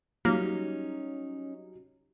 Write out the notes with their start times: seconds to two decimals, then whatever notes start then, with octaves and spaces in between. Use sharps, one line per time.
0.25 F#3 G3 A#3 C#4 D#4